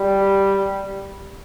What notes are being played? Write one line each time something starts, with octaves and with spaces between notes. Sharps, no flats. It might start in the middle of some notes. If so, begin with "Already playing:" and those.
Already playing: G3